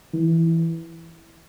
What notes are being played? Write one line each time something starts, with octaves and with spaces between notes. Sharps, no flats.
E3